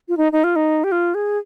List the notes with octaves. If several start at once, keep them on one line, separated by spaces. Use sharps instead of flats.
F4
D#4
D#4
F4
D#4
G4
F4
G#4